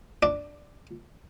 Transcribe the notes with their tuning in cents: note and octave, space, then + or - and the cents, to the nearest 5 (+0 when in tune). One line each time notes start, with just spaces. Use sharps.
D4 +0 D5 +0